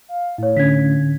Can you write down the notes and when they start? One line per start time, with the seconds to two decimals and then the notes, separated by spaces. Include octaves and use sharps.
0.08 F5
0.38 A2 E4 C#5
0.57 D3 C#4 G#6 B6